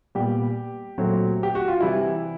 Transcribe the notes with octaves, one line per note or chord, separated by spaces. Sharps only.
A#2 G3 B3 G4
A#2 F#3 A3 C4
G4
F#4
F4
C3 E3 G3 E4